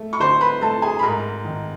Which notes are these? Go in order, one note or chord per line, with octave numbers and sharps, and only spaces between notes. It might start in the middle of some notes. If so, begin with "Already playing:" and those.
Already playing: A3
C#6
D3 C5 C6
B4 B5
A3 A4 A5
G#4 G#5
B5
G#2 A#4 A#5
D#3